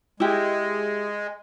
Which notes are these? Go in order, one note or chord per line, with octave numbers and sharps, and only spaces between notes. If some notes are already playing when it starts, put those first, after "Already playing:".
G#3 E4 G4